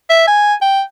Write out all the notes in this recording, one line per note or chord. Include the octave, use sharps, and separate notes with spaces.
E5
G#5
G5